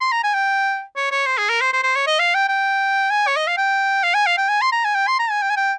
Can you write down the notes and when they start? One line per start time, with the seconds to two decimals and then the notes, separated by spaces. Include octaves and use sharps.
0.01 C6
0.11 A#5
0.23 G#5
0.34 G5
0.96 C#5
1.11 C#5
1.26 C5
1.38 G#4
1.49 A#4
1.61 C5
1.73 C5
1.83 C5
1.96 C#5
2.07 D#5
2.19 F5
2.34 G5
2.49 G5
3.11 G#5
3.27 C#5
3.36 D#5
3.47 F5
3.57 G5
4.03 F5
4.14 G#5
4.26 F5
4.37 G5
4.49 G#5
4.61 C6
4.72 A#5
4.84 G#5
4.95 G5
5.07 C6
5.19 A#5
5.30 G#5
5.42 G5
5.50 G#5
5.57 G5